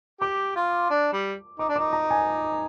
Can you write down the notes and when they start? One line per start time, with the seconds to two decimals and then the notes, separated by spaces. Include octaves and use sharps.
0.21 G4 D6
0.56 F4
0.90 D4
1.13 G3
1.59 D#4 D6
1.69 D4
1.76 D#4 D6
1.93 A#5
2.11 G#5